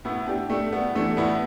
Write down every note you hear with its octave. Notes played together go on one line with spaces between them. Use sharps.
A2 B3 E4
A2 D4 G4
A2 A3 D4
G3 B3
E3 A3 D4
A2 B3 E4